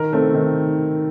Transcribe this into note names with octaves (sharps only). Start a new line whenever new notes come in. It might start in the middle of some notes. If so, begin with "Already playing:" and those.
Already playing: D#3 A#4
A3 C4
D#3